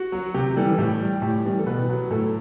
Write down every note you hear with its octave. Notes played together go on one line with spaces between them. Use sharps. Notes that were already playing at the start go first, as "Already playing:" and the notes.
Already playing: F#4
F#3
C3 G4
E3 G3 A4
A2 G4
G3
A2 G4
E3 G3
A4
B2 B4
F#3
A2 A4